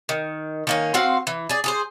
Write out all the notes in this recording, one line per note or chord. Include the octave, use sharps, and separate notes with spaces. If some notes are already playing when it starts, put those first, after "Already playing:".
D#3
D#3 A#3 C#4
C4 F#4 F5
E3
G#4 D5
G#4 A4 C5